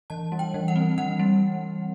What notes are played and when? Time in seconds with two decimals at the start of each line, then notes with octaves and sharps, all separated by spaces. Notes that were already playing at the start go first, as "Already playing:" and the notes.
0.10 E3 A5
0.32 G3
0.39 G5
0.54 E3
0.68 F#5
0.76 C4
0.98 E3 F#5
1.19 G3